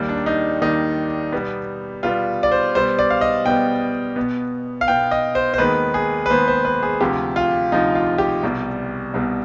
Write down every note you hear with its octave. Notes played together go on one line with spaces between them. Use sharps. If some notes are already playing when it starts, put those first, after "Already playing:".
Already playing: D#2 D#3 G3
D4
D#4
D#2 D#3 G3 D#4
B2 G3 B3
B2 G3 B3 F4
D5
C5
B2 G3 B3 C5
D5
F5
D#5
B2 G3 B3 G5
B2 B3
F5
B2 B3 G5
D#5
C5
C5
D#2 D#3 G#3 B3 B4
G#4
B4
D#2 D#3 G#3 B3 C5
C5
B4
G#4
D2 C3 F3 G4
F4
D2 C3 F3 D#4
F4
G4
C2 B2 G3
C2 B2 G3